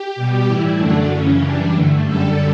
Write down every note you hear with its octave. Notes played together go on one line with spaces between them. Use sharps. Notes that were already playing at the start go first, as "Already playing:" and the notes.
Already playing: G4
B2 G3
A2 E3 G3 E4
F#2 D3 F#3 A3 D4
F#2 C#3 E3 C#4
F#2 E3 G3 D4
G2 D3 A3
F#2 D3 G3 A4